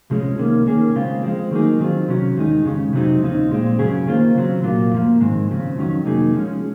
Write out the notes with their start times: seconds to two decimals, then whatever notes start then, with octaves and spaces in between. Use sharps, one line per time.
0.10 C#2 C3 F3 G#3 C#4
0.38 C2 C3 D#3 A#3 C#4
0.66 D#3 A#3 C#4 G#4
0.96 C#3 G#3 C4 F4
1.23 F3 G#3 C4
1.51 D#3 F#3 A#3 D#4 G#4
1.80 D#3 F#3 C4 F4
2.08 C3 F#3 C#4
2.37 D#2 D#3 G#3 D#4
2.65 F2 C#3 G#3 C#4
2.93 C3 F#3 C4 D#4
3.22 D#2 C#3 F3 C4 D#4
3.51 A#2 G#3 C4
3.79 F#2 C#3 F#3 C#4 G#4
4.07 D#3 A#3 F4 C5
4.35 C#3 F#3 C4
4.63 C2 A#2 F#3 A#3 F4
4.92 F#2 F3 A#3
5.20 G#2 D#3 G#3 C4
5.48 C#3 F3 C4
5.77 F2 D#3 F#3 C#4
6.05 C3 F#3 A#3 D#4 G#4
6.34 F3 G#3 C#4